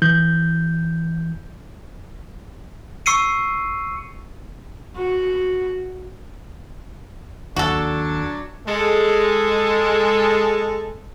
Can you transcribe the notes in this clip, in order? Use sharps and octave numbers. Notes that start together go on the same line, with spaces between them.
E3 G6
C#6 E6 C7 C#7 D#7
F#4
D#2 F#3 D4 F#4 A4
G#3 A4